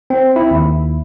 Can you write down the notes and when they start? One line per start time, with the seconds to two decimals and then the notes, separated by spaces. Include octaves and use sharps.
0.10 C4
0.36 E4
0.51 D#2